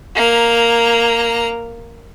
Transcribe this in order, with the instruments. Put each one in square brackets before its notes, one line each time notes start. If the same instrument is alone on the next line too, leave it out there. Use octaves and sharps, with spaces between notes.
[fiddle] A#3 A#5